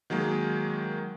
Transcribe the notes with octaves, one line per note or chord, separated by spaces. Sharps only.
D#3 F#3 G#3 A#3